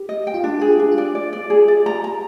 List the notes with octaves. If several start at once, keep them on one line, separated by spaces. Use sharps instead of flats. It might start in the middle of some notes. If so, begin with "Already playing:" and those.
Already playing: G4
D#5
G5
F4
D4 G4
G4 G#4
F4
D4
F4
D5
D5
D5
G#4
D5
A#5
A#5